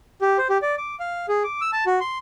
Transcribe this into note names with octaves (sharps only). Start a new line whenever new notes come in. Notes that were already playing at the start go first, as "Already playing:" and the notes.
G4
C5
G4
D5
D6
F5
G#4
D6
E6
A5
F#4
C6